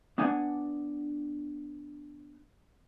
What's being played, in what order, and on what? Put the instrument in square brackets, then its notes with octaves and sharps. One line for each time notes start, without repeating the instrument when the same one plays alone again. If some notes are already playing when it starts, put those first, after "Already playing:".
[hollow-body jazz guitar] B3 D4 F#5 G#5